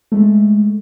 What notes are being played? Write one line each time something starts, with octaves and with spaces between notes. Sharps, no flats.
G#3 A3